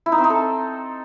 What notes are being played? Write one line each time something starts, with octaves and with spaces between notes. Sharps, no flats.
E4
D#4
C4
D#4
A4